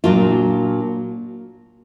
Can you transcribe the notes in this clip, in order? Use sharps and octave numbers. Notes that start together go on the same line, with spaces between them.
A#2 F#3 A#3 D4 F4